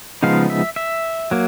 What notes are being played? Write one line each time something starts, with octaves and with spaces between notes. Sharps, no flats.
C#3 F3 G#3 B3 D#4 F5
E5
E5
F#3 A#3